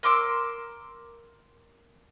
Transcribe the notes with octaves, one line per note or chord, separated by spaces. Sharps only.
A#4 C6 D6 E6